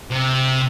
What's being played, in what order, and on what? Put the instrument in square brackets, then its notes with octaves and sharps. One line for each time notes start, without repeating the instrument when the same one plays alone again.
[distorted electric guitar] C3